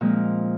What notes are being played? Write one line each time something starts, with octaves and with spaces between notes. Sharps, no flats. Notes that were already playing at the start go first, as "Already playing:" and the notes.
A#2 F3 G#3 C4